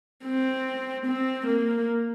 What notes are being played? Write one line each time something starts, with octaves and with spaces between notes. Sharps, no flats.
C4
C4
A#3